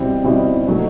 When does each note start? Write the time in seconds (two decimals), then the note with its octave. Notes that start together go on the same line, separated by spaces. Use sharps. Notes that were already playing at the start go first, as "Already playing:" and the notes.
Already playing: B2 G3 C4 E4
0.24 B2 G3 C4 E4
0.68 B2 F#3 A3